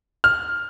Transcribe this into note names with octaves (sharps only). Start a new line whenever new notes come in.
F6